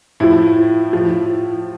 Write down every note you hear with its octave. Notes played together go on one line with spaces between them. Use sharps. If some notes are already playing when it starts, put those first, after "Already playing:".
A2 F3 E4
A2 F3